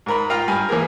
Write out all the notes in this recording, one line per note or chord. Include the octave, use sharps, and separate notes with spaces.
G#2 A#4 B5
F4 F5 G5 A#5 F6
G2 G#5 B5
E3 A#3 G#4 A#4